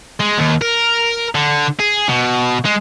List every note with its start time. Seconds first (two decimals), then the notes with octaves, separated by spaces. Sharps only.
0.20 G#3
0.38 D#2
0.62 A#4
1.35 D3
1.80 G#4
2.09 B2
2.65 G#3